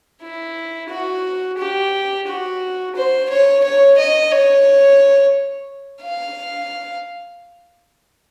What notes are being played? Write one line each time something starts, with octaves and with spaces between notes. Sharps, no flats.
E4
F#4
G4
F#4
C5
C#5
C#5
D#5
C#5
F5